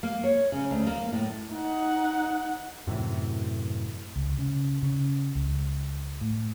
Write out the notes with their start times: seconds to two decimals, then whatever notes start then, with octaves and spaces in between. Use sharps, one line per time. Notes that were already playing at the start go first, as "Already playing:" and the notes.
0.03 A#3
0.24 C#5
0.52 C#3
0.71 D2
0.87 A#3
1.12 A2
1.52 D#4 F#5
2.87 F#2 A2 C3 E3
4.16 C#2
4.38 C#3
4.83 C#3
5.35 C#2
6.21 A2